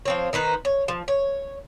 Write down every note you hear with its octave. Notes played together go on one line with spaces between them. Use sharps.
F3 C4 C#5
D#3 D#4 B4 C5
C#5
F3
C#5